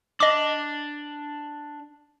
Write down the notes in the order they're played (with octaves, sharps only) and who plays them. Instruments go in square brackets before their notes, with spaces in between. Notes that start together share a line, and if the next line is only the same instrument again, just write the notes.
[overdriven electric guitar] D4 [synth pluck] D#5 D6